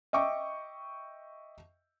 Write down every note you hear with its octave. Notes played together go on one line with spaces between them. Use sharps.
D#5 E5 G5 C#6 D6